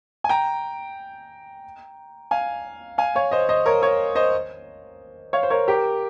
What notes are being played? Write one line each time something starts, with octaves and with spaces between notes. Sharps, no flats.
G#5
G5 A#5
F5 G#5
F5 G#5
C#5 F5
C5 D#5
C5 D#5
A#4 C#5
A#4 C#5
C5 D#5
C#5 F5
C5
A#4 C#5
G4 A#4